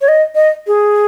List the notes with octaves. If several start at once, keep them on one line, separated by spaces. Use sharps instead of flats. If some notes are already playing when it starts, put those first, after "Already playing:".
C#5
D#5
D#5
G#4